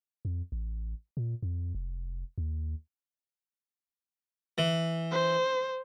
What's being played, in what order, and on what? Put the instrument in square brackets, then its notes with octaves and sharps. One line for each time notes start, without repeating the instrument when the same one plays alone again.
[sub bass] F2
A1
A#2
F2
F1
D#2
[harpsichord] E3
[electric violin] C5